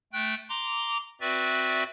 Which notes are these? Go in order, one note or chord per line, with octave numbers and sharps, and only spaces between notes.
A3 G5 F#6
A#5 C6 D6
C4 F#4 B4 D5 E5